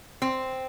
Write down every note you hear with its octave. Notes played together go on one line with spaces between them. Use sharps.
C4